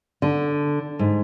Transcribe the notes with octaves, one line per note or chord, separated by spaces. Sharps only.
D3
G#2